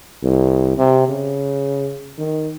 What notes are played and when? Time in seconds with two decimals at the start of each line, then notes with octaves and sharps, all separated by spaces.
0.23 C2
0.78 C3
1.08 C#3
2.18 D#3